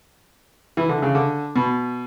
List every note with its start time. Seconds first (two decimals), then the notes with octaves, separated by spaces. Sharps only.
0.77 E3
0.89 D3
1.02 C#3
1.15 D3
1.56 B2